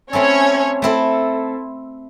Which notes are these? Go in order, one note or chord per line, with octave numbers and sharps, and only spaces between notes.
A3 C4 C#4 E4 A4 C#5
A3 C4 E4 A4